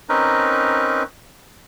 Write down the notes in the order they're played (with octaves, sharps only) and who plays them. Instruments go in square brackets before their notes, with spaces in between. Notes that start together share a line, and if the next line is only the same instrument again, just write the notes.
[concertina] C4 C#4 D#4 A#4 B4